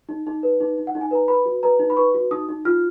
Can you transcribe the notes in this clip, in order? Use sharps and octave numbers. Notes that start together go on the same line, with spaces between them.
D#4
D#4
B4
D#4
D#4
F#5
D#4
G#5
B4 A#5
B4 B5
F#4
B4 A#5
D#4
B5
B4 C#6
F#4
D#4 D#6
D#4
F4 F6